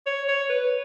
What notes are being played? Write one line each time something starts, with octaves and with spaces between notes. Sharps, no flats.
C#5
C#5
B4